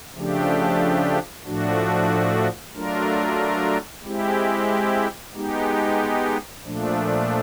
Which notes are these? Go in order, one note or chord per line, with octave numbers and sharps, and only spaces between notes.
C#3 F3 A3 D4 G4
A2 F3 A3 D4 F#4
F#3 A3 D4 F4 A#4
G#3 C4 E4 G4
G#3 B3 D#4 G4
A#2 F3 A3 D4